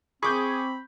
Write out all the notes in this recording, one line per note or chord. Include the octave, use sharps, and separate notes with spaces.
C4 G#4 B5 C#6 D6 G6